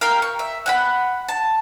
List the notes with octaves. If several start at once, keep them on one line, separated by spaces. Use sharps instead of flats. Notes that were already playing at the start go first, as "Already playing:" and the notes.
G4 A#4 F5
C#6
E5
F#5 G5 B5
A5